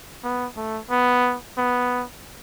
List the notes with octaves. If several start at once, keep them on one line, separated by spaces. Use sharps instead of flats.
B3
A3
B3
B3